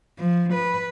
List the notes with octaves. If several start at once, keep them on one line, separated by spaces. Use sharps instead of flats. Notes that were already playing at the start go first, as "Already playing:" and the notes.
F3
B4